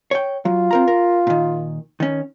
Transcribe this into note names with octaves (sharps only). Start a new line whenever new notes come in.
C#5 G5
F#3 F4
C4 A#4 A#5
A#4
A#2 D#3
D#3 C#4